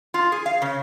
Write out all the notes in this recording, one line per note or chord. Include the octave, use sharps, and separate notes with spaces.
F4
G#4
F5
C#3